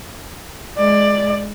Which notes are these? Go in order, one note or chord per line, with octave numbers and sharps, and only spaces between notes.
G#3 D5